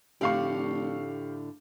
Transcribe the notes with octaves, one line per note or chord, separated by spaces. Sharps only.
F1 A2 D3 G4 D5 F5 C#6